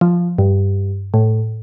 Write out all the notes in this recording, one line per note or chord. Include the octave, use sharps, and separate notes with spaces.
F3
G2
A2